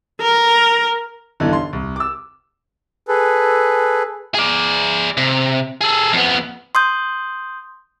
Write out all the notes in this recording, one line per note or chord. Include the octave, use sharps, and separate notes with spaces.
A#4
B1 G2 D3 E3
C6
C2
D6 E6
G#4 A4 B4
G#4 D5
C3
G#4 A4
F2 B3
C6 D#6 G6